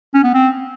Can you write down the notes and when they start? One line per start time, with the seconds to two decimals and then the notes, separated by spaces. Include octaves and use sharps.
0.14 C#4
0.24 B3
0.34 C4